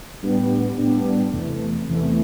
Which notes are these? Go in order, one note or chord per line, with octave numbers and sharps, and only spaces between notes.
A2 G3 B3 D4 G4
A2 G3 B3 D4 G4
E2 C3 E3 A3
E2 C3 E3 A3